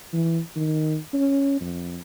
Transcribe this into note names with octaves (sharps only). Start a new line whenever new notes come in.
E3
D#3
C#4
F2